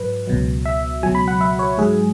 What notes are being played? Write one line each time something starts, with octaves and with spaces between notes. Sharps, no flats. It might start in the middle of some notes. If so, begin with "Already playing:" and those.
Already playing: G#2 F#3 B4
C#2 B2 F#3
E5
C#2 B2 F#3 G#5
B5
F#5
E5
C#5
G#2 F#3 G#4